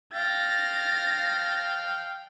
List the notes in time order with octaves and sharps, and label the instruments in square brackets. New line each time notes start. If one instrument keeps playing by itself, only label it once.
[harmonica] F5 G5 [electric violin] A6 A#6